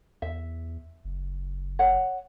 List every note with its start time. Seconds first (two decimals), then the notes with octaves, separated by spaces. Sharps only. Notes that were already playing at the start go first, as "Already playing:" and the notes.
0.22 E2 E5
1.05 F#1
1.79 C#5 F#5